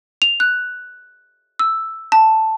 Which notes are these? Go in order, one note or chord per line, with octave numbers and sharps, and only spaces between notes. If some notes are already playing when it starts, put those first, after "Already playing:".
F7
F#6
E6
A5